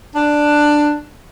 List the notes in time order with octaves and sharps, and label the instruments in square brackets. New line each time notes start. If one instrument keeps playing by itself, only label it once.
[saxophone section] D4